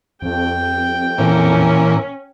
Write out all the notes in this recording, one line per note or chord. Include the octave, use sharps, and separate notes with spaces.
F2 G5
A#2 E3 C#4